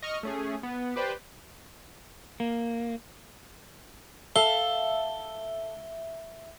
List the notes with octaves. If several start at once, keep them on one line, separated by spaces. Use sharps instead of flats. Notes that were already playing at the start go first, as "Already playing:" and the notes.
D#5 C#6 F6
A3 C#4 G#4
B3
G4 B4 C5 D5 G5
A#3
A4 E5 F5 G7